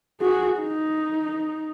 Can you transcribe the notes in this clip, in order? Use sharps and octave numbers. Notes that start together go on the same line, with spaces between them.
F#4 G#4
D#4